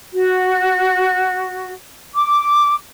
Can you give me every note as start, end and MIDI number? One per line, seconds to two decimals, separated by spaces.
0.13 1.73 66
2.14 2.74 86